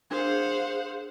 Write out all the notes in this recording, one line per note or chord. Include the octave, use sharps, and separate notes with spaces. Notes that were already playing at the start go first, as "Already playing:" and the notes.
D4 G#4 A#4 C5 F5 F#5 D6